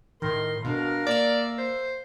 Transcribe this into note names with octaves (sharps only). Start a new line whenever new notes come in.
A2 D#3 A#4 C6
B2 D4 A#4 F5
A#3 D5 E5 E6
C5